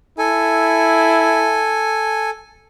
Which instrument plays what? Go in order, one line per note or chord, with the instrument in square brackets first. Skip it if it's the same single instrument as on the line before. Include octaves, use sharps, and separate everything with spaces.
[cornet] E4 [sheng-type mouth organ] A4 G#5